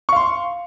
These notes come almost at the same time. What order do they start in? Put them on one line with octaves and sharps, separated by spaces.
C#6 F5 C6